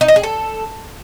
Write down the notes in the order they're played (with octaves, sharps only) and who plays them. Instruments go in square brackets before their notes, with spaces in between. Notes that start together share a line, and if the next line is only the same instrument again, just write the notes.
[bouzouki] D#4
D#5
G#4
A4